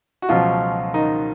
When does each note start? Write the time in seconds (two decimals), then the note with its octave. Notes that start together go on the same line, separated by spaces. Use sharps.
0.22 F#4
0.29 C#2 B2 F3 F#3 F4
0.94 D#3 D#4